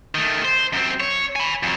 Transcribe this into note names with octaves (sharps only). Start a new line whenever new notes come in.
D#3 A3
C5
F#2 C4
C#5
G#5 B5
F2 F#3